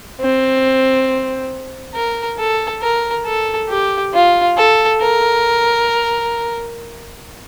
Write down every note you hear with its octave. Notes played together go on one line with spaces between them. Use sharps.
C4
A#4
A4
A#4
A4
G4
F4
A4
A#4